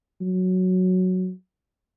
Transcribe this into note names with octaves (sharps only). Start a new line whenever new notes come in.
F#3